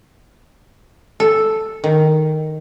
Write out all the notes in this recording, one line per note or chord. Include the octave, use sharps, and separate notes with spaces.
A4
D#3